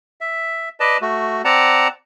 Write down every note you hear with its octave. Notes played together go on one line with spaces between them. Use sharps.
E5
B4 D5 D#5 A5
A3 F#4
C4 D5 F#5 A5 A#5